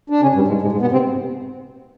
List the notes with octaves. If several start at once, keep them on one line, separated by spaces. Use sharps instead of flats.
D4
C#3 C#4
G2 G3
G#2 G#3
G#2 G#3
G#2 G#3
B2 B3
C3 C4